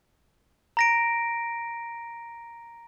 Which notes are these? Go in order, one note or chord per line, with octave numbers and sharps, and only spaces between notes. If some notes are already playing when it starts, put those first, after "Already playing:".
A#5 A#6 D7